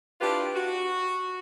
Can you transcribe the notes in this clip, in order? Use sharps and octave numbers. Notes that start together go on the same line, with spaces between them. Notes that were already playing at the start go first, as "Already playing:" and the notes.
D4 E4 F4 G4 B4
F#4